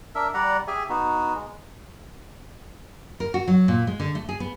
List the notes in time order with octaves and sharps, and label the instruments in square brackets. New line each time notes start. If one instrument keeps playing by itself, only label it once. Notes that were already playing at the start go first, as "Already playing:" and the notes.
[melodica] D4 A#4 E5 E6
G3 D5 F#5 A#5
G4 G#4 E5 G#5
B3 D#4 F#4
G#3
[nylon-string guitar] A#4
F#4
F#3
A#2
G#3
D3
A3
G#4
B3